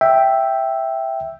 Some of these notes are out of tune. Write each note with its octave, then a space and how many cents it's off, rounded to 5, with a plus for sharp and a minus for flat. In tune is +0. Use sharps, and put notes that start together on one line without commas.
E5 +0 G5 +0